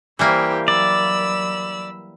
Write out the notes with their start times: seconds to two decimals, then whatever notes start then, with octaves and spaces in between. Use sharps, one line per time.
0.19 E3 G3 A#3 E4 G4 C5
0.68 F#3 D5 B5 E6